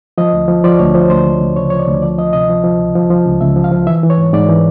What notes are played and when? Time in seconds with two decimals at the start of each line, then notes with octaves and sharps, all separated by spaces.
0.18 F3 D#5
0.33 D2
0.48 F3
0.64 F3 D5
0.79 D2 C#5
0.95 F3 C5
1.10 D2 C5
1.25 D2
1.41 D2
1.56 C#3 C#5
1.70 F3 C#5
1.79 D5
1.87 D2
2.02 F3 D5
2.18 F3 D#5
2.33 C3 D#5
2.49 F3
2.64 F3
2.80 C#2
2.95 F3
3.10 F3
3.26 C#2
3.41 C#2 E5
3.56 F3
3.64 F5
3.72 F3
3.87 E3 E5
4.03 E3
4.10 C#5
4.18 G#2
4.33 G#2 D5
4.49 E3